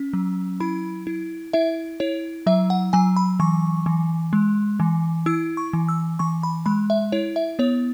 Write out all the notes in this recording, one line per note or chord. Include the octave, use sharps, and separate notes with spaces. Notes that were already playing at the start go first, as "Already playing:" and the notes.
Already playing: C#4
F#3
E4 B5
E4
E4 E5
E4 C#5
F#3 E5
F#5
F#3 G#5
B5
E3 C#6
E3
G#3
E3
E4 E6
C#6
E3
E6
E3 C#6
B5
G#3 B5
E5
E4 C#5
E5
B3 C#5